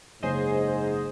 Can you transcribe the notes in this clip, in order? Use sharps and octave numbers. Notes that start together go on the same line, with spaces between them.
F#1 G#2 G#4 C5 C#5 D#5